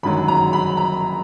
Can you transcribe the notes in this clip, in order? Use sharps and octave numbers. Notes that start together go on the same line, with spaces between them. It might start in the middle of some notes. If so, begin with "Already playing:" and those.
G1 F#2 D#3 F#3 B5
A#5
B5
A#5